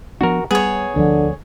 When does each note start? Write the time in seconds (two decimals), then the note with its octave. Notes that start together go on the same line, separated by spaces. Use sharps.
0.21 F3 B3 D4 F#4 A#4
0.51 G3 B3 G#4 C#5
0.96 D2 D3 F3